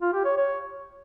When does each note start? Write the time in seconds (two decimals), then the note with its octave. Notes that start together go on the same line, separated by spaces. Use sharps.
0.01 F4
0.13 G4
0.25 C#5
0.37 C#5